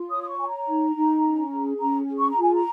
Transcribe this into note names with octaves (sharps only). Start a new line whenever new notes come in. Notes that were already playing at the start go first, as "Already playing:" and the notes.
Already playing: F4
C#5 D#6
D#6
C#6
C#5 G#5
A#5
D#4
D#4
C#4
G#4
C#4 A#5
G#4
C#6
A#5
F4 G#5
A#5